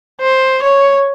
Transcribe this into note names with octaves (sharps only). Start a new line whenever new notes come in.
C5
C#5